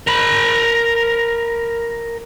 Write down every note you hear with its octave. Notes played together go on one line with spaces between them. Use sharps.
A#4 B5